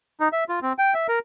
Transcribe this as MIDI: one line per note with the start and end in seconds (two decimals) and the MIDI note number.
0.20 0.28 63
0.33 0.44 76
0.49 0.59 65
0.62 0.73 60
0.78 0.94 79
0.94 1.07 76
1.08 1.19 70